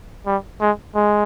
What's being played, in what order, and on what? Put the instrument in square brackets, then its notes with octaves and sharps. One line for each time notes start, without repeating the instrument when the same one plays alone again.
[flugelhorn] G3
G#3
G#3